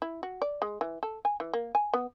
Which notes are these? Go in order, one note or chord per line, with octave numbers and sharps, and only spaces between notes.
E4
F#4
D5
G#3
E3
A4
G#5
E3
A#3
G#5
B3